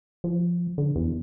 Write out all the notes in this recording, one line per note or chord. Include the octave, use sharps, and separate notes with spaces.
F3
D3
E2